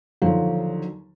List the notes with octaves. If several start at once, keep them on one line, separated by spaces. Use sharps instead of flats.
D#2 D3 F3 F#3